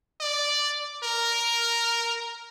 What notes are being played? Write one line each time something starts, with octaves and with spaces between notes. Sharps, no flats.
D5
A#4